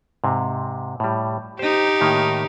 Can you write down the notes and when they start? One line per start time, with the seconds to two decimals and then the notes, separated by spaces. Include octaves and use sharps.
0.24 G#2 C3
1.00 A2 G3
1.59 D#4 G4 C5
2.01 A2 D#3 A#3